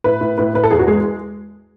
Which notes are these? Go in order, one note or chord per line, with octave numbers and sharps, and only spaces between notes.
A2 B4
A2
A2 B4
A2 B4
A4
E2 G#4
F#4
G#3 G#4